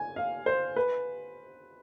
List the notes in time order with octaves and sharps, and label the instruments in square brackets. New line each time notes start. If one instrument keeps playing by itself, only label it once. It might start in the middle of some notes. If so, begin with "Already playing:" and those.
Already playing: [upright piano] G#5
F5
C5
B4